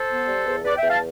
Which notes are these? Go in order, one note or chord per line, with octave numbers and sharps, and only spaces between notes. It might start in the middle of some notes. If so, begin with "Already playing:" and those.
Already playing: A4 C5
B3
G3
E2
E2 B4 D5
E5 G5
E2
F5 A5